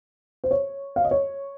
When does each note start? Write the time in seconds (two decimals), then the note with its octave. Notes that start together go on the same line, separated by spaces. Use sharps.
0.44 C5
0.51 C#5
0.96 F5
1.04 D#5
1.11 C#5